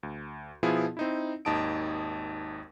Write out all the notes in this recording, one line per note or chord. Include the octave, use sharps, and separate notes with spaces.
D2
B2 F3 B3 E4 F4 G#4
C4 D#4 E4
G#1 D#2 D#4 A5 D#6 D7